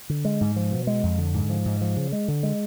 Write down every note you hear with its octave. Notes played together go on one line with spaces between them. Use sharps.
D3
G#3
G#2
F3
B2
G#3
F2
D3
G#2
F3
G#2
F3
C#3
G#3
D3
G#3